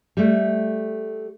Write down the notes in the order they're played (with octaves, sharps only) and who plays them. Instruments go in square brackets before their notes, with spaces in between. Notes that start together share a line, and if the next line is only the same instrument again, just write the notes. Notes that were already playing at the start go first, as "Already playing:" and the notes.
[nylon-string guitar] G3 A3